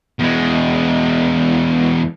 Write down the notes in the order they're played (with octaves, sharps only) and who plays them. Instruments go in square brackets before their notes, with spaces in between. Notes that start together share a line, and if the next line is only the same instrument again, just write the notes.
[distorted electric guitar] E2 G#3